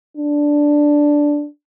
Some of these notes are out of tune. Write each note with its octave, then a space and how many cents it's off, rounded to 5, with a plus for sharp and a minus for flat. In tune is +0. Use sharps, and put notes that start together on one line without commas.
D4 -5